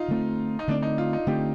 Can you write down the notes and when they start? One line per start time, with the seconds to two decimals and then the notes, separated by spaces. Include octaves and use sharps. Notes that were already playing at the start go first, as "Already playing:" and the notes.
Already playing: D#4 F4
0.08 D3 A3 C4
0.59 D#4
0.68 D3 A3 C4 D4
0.83 D#4
0.98 F4
1.13 D#4
1.27 D3 A3 C4 G4